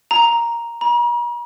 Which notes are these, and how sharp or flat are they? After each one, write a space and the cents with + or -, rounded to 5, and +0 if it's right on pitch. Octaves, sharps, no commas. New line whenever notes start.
A#5 +5
A#5 +45